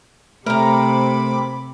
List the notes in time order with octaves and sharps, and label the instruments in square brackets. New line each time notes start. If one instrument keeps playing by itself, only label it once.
[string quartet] C3 [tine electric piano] A3 [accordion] C4 B5 D6 [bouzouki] A#4 A#5